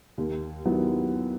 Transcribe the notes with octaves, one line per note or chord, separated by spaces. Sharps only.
D#2
D#3 F#3 B3 E4